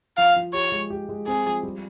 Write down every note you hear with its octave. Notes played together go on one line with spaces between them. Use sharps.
F3 F5
F3
G4 C#5
G#3
G4
G#3
C4 G#4
F3
G3